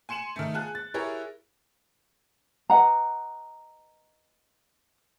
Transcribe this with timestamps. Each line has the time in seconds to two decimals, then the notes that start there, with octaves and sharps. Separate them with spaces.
0.09 G#5 C6 C#7 E7 F#7
0.36 D#3 A3
0.54 F4 G#4 G#5 A5 F#6
0.75 A6
0.94 E4 G4 G#4 A#4 C#5
2.70 B4 D#5 F#5 A#5